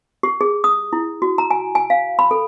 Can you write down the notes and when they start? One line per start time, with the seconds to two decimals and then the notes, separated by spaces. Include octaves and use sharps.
0.23 G4
0.41 G#4
0.64 D#6
0.93 E4
1.22 F#4
1.38 A#5
1.51 G#5
1.75 G#5
1.90 F5
2.19 B5
2.31 A4